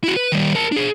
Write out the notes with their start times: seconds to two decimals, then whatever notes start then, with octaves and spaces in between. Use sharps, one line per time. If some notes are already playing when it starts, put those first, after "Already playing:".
0.04 E4 F#4
0.16 B4
0.32 D#3 G3
0.55 A#4 A5
0.72 D4 G#4